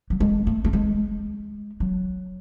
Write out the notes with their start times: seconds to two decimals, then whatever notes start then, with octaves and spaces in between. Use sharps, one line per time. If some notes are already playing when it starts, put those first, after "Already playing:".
0.10 F#3
0.20 G#3
0.47 A3
0.65 A3
0.73 G#3
1.80 F#3